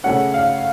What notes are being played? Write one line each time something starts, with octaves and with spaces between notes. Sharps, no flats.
C#3 A3 C#4 F#5
F5